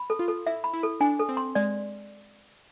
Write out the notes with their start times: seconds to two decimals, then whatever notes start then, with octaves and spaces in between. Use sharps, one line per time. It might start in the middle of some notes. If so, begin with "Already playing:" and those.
Already playing: B5
0.10 A4
0.19 F4
0.28 A4
0.47 E4 E5
0.64 B5
0.73 E4
0.83 A4
1.00 D4 G#5
1.20 A4
1.29 C4
1.37 C6
1.55 G#3 D5